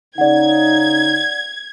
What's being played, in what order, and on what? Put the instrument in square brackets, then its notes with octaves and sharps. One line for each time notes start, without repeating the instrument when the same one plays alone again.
[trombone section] C#3 D#4 [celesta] D5 F#5 [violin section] G#6